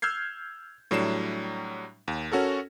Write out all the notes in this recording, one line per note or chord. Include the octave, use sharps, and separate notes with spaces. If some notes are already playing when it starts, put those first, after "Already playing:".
E6 F6 G6 G#6 C7
A2 F#3 G3 D4 C7 E7
D#2
C#4 F#4 A4 A#4